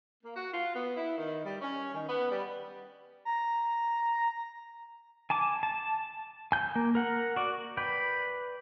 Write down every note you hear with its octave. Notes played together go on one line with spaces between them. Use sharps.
A#3
F#4
F4
B3
E4
D#3
G3
C#4
D#3
B3
G3
A#5
G#5 A5 D6
A5
G#5 G6
A#3
A#4 F#5
F#4 D5
B4 D5 G5 B5